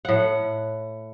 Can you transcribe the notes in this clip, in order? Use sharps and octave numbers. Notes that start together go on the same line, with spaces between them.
A2 F#5